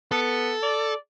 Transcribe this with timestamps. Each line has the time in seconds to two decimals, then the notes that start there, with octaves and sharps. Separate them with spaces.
0.12 B3 A4
0.63 D5